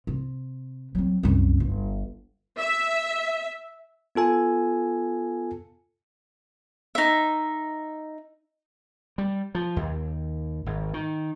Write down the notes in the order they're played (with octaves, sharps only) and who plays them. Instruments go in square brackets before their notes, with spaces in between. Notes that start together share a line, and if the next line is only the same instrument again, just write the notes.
[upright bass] C3
F#3 C4
C2 F#2
G1
[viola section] E5
[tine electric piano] B3 F4 A4 G#5
[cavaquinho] D#4 E5
[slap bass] G3
F3
D#2
G#1
D#3